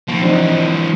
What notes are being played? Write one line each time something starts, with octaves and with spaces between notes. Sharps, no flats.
F3 A#3 D#4
E3 F#3 C4 D4 D#4